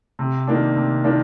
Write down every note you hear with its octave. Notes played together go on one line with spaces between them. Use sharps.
C3
D#3 A#3 D4
C3
D#3 A#3 D4